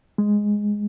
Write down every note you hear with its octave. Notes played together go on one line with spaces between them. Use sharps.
G#3